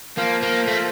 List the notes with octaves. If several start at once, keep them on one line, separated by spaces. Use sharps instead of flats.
F3 A#3
A#3
A3